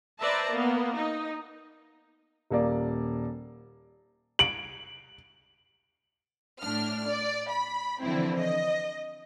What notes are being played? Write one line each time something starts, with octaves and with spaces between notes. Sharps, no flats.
B4 C5 D5 E5 A5 A#5
A#3 B3
D#4
D#1 A#3 D5
D7 F#7
A2 D4 F6
D5
B5
D3 E3 F3 C4 E4
D#5